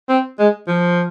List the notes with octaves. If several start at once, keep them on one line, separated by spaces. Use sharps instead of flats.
C4
G#3
F3